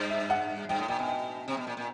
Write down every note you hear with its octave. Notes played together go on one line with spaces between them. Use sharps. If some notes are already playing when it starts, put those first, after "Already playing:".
Already playing: G2
E5
F#5
G2 G5
A2
A#2 G5
B2 G#5
G5
C3
B2
A#2
A#2